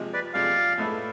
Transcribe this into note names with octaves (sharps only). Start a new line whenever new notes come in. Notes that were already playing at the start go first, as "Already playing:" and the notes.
Already playing: C3 F3 G#3
B4 D5
C3 F3 G#3 D5 F5
A2 G#3 B3 E4 A4